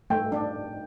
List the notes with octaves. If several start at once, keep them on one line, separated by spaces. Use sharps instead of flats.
A3 G5
D4